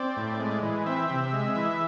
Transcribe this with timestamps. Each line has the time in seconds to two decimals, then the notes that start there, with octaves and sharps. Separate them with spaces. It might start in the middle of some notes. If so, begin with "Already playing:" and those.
Already playing: C4 D5
0.16 A2
0.40 G#3
0.62 E3
0.86 C4 E5
1.10 C3
1.33 G#3
1.56 E3